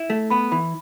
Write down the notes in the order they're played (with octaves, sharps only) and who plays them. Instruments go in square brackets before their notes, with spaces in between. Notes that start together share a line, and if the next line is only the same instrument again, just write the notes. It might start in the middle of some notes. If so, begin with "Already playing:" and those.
Already playing: [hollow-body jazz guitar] E4
A3
[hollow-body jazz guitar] B3 [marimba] B5
[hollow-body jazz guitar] E3 [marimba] B5